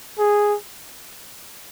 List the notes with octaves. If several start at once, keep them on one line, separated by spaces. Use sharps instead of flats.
G#4